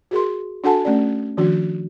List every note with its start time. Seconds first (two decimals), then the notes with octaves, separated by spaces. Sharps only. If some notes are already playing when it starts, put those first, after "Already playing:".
0.11 F#4 G#4 A#4 C6
0.64 D4 F#4 A4 F#5 G#5 A5
0.85 A3 C#4 D5
1.37 D#3 F3 D4 F#4